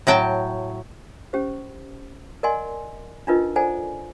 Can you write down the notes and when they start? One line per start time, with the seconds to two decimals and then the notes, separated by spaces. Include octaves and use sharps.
0.07 A2 F#3 G5 A5
1.33 C#4 G4 C5
2.43 A#4 D5 D#5 F#5 G#5 C6
3.27 D4 D#4 F4 A#4 B4 D#5
3.56 A4 C5 D5 F#5 G#5 A#5